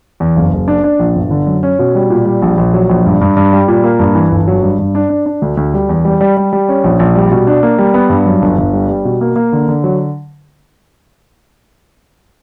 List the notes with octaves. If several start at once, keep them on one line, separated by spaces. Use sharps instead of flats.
E2
F#1
F#1
D4
D4
A#1
G1
D3
F#2
C#4
B2
G3
A#2
G3
A#1
A#1
F#3
A#1
G2
G2
G2
G3
A#2
A#3
G2
E3
G1
F#3
G2
G2
D4
D4
D4
D2
D2
G3
E2
G3
G3
G3
G3
C#4
A#1
A#1
G3
B2
D4
A#3
G3
B3
G2
F#2
G1
G1
G3
G3
B2
A#3
A#3
D3
D3
F#3